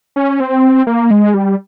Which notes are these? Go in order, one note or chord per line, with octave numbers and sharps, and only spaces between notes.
C#4
C4
A#3
G#3
G3